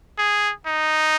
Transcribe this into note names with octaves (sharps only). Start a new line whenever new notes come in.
G#4
D#4